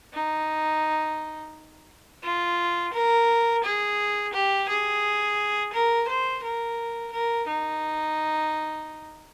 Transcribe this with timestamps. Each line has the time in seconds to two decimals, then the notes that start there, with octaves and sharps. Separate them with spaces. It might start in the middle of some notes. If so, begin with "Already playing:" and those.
0.13 D#4
2.23 F4
2.93 A#4
3.63 G#4
4.33 G4
4.68 G#4
5.73 A#4
6.08 C5
6.43 A#4
7.12 A#4
7.47 D#4